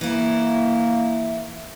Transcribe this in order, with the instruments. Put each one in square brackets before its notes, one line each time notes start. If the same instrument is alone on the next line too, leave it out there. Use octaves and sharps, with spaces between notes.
[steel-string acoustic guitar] E3 E4 [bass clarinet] A#3